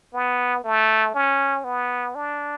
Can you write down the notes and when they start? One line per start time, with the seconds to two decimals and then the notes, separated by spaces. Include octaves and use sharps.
0.14 B3
0.64 A3
1.14 C#4
1.64 B3
2.15 D4